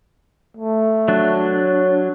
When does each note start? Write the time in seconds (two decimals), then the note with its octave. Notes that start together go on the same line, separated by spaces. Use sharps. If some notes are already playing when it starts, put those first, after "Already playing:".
0.57 A3
1.08 F#3 D4
1.61 C#5